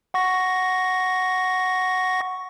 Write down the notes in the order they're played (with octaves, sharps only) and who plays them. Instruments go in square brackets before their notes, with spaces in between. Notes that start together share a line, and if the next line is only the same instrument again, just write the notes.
[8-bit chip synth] F#5 C#6 A#6